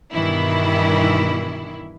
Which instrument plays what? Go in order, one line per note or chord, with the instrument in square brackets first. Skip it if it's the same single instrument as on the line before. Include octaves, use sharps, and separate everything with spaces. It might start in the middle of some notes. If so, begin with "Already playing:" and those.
[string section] G2 B2 D#3 E3 E4